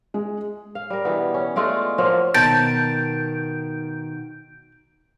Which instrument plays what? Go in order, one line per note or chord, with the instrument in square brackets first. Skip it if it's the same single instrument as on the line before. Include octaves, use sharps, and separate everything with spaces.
[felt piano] G#3
[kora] F5
G3 A#4
B2 E3 B3
C#4
G#3 A3 F4 D5
F3 F#3 A#3 F4
[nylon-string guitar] B2 D#3 [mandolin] A5 [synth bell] G6 D7